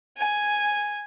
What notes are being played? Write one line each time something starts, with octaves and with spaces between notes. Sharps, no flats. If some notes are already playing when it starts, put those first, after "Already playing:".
G#5